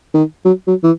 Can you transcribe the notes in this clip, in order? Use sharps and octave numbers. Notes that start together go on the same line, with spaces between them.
D#3
F#3
F#3
E3